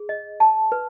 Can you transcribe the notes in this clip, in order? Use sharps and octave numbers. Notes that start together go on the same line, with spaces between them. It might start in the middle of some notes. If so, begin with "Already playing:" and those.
Already playing: G#4
D#5
A5
B4